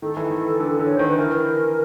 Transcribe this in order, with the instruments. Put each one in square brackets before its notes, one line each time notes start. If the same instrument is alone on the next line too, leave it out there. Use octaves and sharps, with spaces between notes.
[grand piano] D#3 [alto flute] A4
[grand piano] E3
D#3
D3
D3
[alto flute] C#5
[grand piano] D#3 [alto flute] C5
[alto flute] B4
[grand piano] E3 [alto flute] A#4